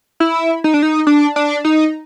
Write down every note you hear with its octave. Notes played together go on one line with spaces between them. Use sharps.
E4
D#4
D4
D#4
D4
D4
D#4